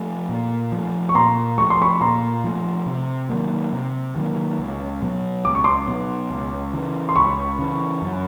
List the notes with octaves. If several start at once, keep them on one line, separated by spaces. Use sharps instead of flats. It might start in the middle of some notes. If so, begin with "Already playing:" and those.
Already playing: F3 A3
A#2
F3 A3
C#6
A#2 A#5 C6
F3 A3 C#6
C6
B5 C#6
A#2 A#5 C6
F3 A3
C3
D#3 F#3 A#3
C3
D#3 F#3 A#3
C#2
B2 F#3 B3
C#2 D6
C#6
C6 D6
B2 F#3 B3
C#2
C#3 E3
C6
C#2 B5 C#6
C#3 E3
F#2